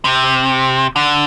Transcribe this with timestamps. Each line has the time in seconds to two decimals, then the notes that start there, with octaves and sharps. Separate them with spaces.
0.05 C3
0.96 D3